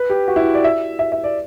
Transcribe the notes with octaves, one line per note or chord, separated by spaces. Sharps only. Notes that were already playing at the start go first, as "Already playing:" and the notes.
Already playing: B4
G4
F#4
E4
D5
E5
E5
E5
D5